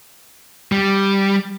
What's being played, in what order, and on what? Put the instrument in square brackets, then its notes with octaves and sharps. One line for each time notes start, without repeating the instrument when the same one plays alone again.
[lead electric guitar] G3